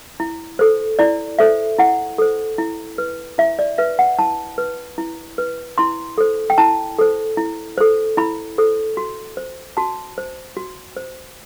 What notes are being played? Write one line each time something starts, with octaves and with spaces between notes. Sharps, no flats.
E4
A4 C5
E4 D5
A4 C5 E5
E4 F#5
A4 C5
E4
B4
E4 E5
D5
B4 E5
F#5
E4 A5
B4
E4
B4
E4 C6
A4 C5
G5
E4 A5
A4 C5
E4
A4 C5
E4 B5
A4 C5
F#4
C5
F#4 A5
C5
F#4
C5